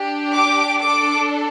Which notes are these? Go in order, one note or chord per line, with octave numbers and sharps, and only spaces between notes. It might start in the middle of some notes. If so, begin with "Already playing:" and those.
Already playing: D4 G4
D6
D4 A4 D6